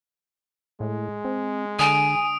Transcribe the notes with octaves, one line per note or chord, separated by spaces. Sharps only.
A2 G#3
C4
D3 G#5 D#6 D7